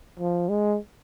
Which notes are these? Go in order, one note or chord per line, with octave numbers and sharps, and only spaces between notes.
F3
G#3